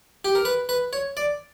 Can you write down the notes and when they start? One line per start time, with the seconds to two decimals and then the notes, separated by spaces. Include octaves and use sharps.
0.25 G4
0.35 A#4
0.45 B4
0.69 B4
0.93 C#5
1.17 D5